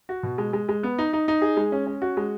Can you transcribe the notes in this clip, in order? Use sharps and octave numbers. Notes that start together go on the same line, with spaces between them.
F#4
B2
G#3
G#3
G#3
B3
D#4
D#4
D#4
G#4
G#3
C#4
C#4
F#4
G#3